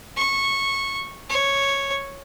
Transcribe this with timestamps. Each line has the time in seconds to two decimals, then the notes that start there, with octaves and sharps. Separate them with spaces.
0.17 C#6
1.30 C#5